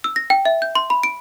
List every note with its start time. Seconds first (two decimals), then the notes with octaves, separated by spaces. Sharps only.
0.04 E6
0.16 A#6
0.30 G5
0.45 E5
0.62 G6
0.75 C6
0.90 B5
1.03 D7